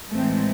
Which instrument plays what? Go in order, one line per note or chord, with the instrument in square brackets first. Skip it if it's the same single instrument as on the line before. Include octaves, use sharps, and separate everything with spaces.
[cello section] A2 E3 G#3 A3 C4